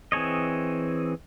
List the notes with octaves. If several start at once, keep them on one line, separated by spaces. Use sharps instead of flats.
E3 C4 G#4 C#5 D#5